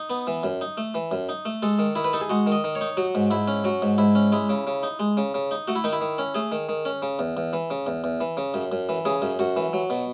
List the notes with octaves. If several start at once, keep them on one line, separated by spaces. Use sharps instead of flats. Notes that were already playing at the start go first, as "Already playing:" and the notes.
Already playing: D#4
B3
E3
F#2
D#4
A3
E3
F#2
D#4
A3
G#3 A4
D#3
D#3 E4
B4
D#4 A4
G#4
G#3 F#4
D#3
D#5
D#3
C#5
D#4
F#3 F#4
G#2
G#2 E4
C#4
F#3 F#4
G#2
G#2 E4
C#4
G#3 E4
C#3
C#3
D#4
G#3
C#3
C#3
D#4
A3 F#4
E4
D#3 D#4
E4
D#3
C#4
A3 G#4
D#3
D#3
C#4
C#3
E2
E2
E3
C#3
E2
E2
E3
C#3
F#2
F#2
E3
C#3 G#4
F#2
F#2 F#4
E3
F#3
B2